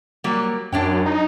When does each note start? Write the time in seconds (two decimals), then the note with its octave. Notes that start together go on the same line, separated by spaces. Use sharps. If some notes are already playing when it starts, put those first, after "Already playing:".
0.24 F#3 G3 A#3
0.72 F#2 D4 C#5 G5
1.06 D#4